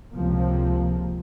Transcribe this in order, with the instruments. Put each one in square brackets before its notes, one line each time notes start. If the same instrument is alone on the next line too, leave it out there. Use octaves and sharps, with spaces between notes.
[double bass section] C#2 C3 F3 A#3